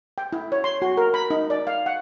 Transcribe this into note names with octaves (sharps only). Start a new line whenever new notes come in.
G5
E4
C#5
C6
F#4
A#4
B5
D#4
D5
F5
F#5